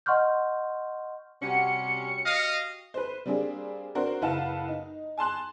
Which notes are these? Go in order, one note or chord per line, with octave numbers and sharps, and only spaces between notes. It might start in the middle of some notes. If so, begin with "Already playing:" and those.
D#5 F#5 C6 C#6 F6 G6
C3 G3 C#4 F#4 G4 F#5 C#7
D#5 F5
B4 C5
G3 A#3 C4 D4 G#4
C4 D4 F#4 A#4 C5
F#1 E4 B4 F5 F#5 A5
D#4
G#5 A5 C6 F#6